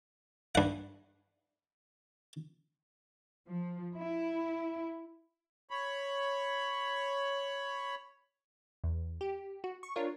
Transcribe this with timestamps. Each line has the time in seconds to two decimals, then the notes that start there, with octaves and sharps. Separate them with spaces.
0.55 G2 F#5
3.47 F3
3.97 E4
5.71 C#5 B5
8.84 E2
9.21 G4
9.64 F#4
9.83 C#6
9.96 D4 F4 A#4 C#5